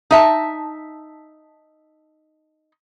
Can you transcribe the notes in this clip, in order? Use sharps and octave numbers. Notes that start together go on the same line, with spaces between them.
D#4 E5 A5